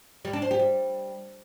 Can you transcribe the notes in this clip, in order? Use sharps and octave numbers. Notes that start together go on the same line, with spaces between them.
G3
D4
C5
G4
G3